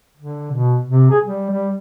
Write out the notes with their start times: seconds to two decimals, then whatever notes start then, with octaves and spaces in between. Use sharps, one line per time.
0.18 D3
0.52 B2
0.88 C3
1.11 G#4
1.24 G3
1.50 G3